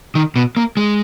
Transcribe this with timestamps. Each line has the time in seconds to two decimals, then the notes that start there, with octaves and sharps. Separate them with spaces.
0.15 D#3
0.36 B2
0.57 A#3
0.77 G#3